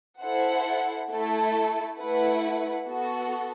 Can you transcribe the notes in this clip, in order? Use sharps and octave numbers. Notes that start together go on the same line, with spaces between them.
E4 A4 C5 F#5
A3 E4 A4
A3 E4 B4 F#5
B3 F#4 A4